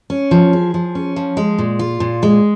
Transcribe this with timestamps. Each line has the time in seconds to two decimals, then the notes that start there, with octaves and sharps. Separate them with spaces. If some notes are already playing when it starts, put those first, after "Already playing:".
0.10 C#4
0.31 F3
0.53 G#4
0.74 F3
0.95 C#4
1.16 F3
1.37 G#3
1.58 A#2
1.79 F4
2.00 A#2
2.23 G#3